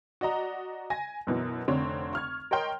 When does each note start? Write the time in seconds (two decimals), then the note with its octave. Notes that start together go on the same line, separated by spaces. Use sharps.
0.21 F#4 D5 D#5 A#5
0.90 G#5 A#6
1.27 F#2 B2 E3
1.68 F1 D3 C4 C#5
2.13 C#6 F6 G#6
2.51 A#4 C#5 D#5 G5 C6 F6